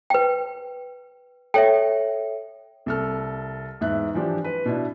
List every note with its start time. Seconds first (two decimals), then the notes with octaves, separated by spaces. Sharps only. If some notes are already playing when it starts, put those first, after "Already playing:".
0.10 B4 G5
1.54 A4 C#5 E5 G5
2.86 C2 A4 F6
3.81 E2 G#2 E5 F#6
4.14 E3 F3 D4 G4
4.44 B4
4.66 B2 D4 E4